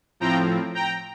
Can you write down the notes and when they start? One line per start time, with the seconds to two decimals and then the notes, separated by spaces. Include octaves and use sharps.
0.20 A2 F3 C4 G5 A#5
0.74 G5 A#5